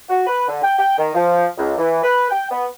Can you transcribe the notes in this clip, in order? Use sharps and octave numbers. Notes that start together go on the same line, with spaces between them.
F#4
B4
D3
G5
G5
D#3
F3
C#2
E3
B4
G5
B3